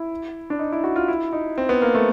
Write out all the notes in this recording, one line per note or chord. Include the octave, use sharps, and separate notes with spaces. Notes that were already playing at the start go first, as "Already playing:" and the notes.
Already playing: E4
D4
D#4
E4
F#4
F4
E4
D#4
C4
B3
A#3
A3